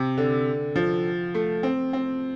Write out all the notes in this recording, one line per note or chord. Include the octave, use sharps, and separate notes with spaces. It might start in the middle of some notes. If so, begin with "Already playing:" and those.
Already playing: C3
D3
F3
A3
C4
C4